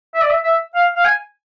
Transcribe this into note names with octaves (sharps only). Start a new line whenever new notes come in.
E5
D5
E5
E5
F5
F5
G#5